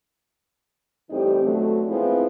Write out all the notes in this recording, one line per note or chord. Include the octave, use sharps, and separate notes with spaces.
A2 E3 G3 C4 D#4 G4
B2 D3 F#3 A3
F3 G#3 B3 C4 E4